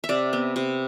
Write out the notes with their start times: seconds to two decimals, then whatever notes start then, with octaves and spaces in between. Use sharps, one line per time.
0.04 E5
0.09 C3 D5
0.33 B3
0.56 C3